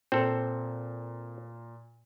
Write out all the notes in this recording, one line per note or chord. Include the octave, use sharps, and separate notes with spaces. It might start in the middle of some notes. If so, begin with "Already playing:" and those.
A#2 C4 A4